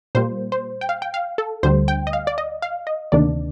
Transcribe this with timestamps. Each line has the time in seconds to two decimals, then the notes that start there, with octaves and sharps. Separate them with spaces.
0.15 A#2 G3 A#3 C5
0.52 C5
0.81 G5
0.89 F5
1.02 G5
1.14 F5
1.38 A4
1.63 D2 D3 G3 C5
1.88 G5
2.07 D#5
2.13 F5
2.27 D5
2.38 D#5
2.62 F5
2.87 D#5
3.12 D2 C3 D#3 A#3 D4 D5